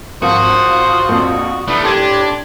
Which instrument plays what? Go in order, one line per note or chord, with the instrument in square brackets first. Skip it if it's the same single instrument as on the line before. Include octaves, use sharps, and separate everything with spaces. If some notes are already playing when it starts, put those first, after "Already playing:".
[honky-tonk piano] G#1 F3 [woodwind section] F4 D#6 [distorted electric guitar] F#4 [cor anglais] C5
[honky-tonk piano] A#1 F2
[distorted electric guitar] E3 A3 [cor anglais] B3 [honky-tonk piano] D4
[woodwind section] A2 [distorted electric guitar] D4 [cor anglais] G4 [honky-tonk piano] C6 G#6 D#7